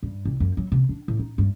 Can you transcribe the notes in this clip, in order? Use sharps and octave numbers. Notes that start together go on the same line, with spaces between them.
G2
C2
F#2
F#3
C3
D4
A2
D#4
G2